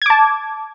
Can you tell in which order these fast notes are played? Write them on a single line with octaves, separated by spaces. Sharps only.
G#6 D6 A5